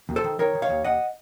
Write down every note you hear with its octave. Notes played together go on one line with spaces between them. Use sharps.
D#2
A4 C5
D#3
D#3 A#4 C#5
D#3
C#5 F5
D#2
D#2 D#5 F#5